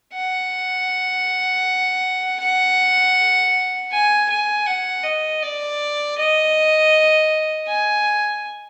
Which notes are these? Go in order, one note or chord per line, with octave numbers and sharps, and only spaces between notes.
F#5
F#5
G#5
G#5
F#5
D#5
D5
D#5
G#5